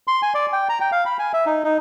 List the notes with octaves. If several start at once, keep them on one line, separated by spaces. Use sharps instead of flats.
C6
G#5
D5
G5
A#5
G5
F5
B5
G#5
E5
D#4
D#4